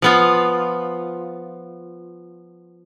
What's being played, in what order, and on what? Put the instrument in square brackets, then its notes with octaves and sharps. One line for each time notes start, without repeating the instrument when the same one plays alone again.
[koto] F3 B3 F4